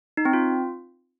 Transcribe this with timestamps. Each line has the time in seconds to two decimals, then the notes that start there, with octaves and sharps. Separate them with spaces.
0.17 D#4
0.25 C4
0.33 F4